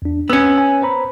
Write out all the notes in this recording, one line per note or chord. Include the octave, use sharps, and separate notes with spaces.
E2 D4
B3 C#4 E6
G#5
C5 A#5 B5